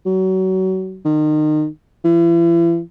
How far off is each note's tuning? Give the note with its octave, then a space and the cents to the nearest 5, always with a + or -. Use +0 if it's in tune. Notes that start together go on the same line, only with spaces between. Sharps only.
F#3 +30
D#3 -30
E3 +40